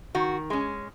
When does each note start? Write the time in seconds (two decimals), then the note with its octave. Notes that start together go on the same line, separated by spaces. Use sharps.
0.15 D#3 F#4
0.50 G#3 C#4